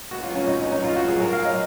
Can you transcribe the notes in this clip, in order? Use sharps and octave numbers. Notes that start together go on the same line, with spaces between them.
C#2 F#4
F4
F#3
C#4
C#2 D#4
C#4
F#3
D#4
C#2 F4
F#4
F#3
G#4
G#2 A#4
F5
F#3
D#5